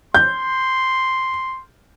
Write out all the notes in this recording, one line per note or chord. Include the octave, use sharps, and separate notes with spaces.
C6 G6